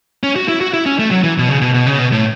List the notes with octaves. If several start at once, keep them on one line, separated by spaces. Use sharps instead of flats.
C#4
F#4
E4
F#4
E4
C#4
A3
F#3
E3
B2
C#3
B2
B2
C#3
B2
A2